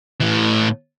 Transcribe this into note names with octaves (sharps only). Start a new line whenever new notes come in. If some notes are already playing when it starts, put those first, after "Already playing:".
A2 E3